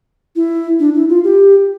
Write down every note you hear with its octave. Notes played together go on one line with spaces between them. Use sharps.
E4
D4
E4
F4
G4